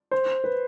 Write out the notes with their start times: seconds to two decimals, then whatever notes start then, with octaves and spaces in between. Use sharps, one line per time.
0.11 C5
0.44 B4